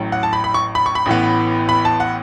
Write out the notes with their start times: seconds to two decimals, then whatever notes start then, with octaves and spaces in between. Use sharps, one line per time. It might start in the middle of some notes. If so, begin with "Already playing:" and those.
Already playing: A1 A2 F#3
0.12 F#5
0.23 A5
0.33 B5
0.44 B5
0.54 C#6
0.75 B5
0.86 C#6
0.95 B5
1.06 A1 A2 E3 B3
1.69 B5
1.85 A5
2.00 F#5